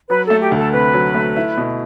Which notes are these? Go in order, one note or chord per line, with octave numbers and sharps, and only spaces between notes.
F#3 B4
A3 A4
G4
D2
A4
C3 B4
F#3
A3
E4
B2